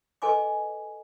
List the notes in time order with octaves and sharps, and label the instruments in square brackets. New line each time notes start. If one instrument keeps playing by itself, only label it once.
[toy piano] A4 B4 D#5 G#5 C6 D6